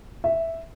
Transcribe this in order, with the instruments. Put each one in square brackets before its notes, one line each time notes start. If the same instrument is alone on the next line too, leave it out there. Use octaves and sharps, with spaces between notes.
[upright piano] E5